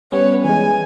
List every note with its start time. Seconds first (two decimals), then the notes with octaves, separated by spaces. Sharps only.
0.12 G3 B3 C#4 B4 C#5
0.45 E3 G#3 G#5